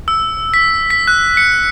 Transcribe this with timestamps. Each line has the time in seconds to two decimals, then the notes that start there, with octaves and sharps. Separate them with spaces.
0.08 E6
0.54 B6
0.90 B6
1.07 F#6
1.37 C#7